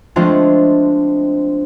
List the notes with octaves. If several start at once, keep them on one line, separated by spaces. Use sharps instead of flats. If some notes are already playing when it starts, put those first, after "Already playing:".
F3 G#3 A3 C4 D4 F4